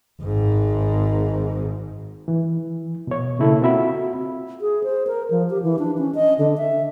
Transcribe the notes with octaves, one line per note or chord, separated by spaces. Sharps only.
G#1 G#2
E3
B2 C#5
C#3 A#3 E4 A4
C4 F4 F#4 E5 B5
G#4
C5
A#4
F3
G4
E3
D4
C#4
D#5
D3
E5